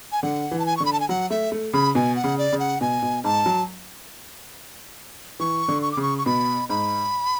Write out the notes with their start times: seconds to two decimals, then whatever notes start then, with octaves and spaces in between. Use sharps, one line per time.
0.12 G#5
0.23 D3 F#5
0.51 E3
0.59 A5
0.66 G#5
0.77 C#6
0.80 D3
0.85 B5
0.93 A5
1.00 G#5
1.09 F#3 F#5
1.30 A3 E5
1.52 A3
1.73 C#3 B5
1.95 B2 G#5
2.16 F#5
2.24 C#3
2.38 D5
2.52 C#3
2.60 F#5
2.81 B2 G#5
3.02 B2
3.24 G#2 A5
3.46 F#3
5.40 E3 C#6
5.68 D3
5.82 C#6
5.92 D6
5.97 C#3
6.02 C#6
6.18 C#6
6.26 B2 B5
6.69 G#2 B5